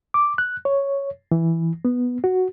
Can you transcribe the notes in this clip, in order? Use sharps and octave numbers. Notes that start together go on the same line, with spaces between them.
D6
F#6
C#5
E3
B3
F#4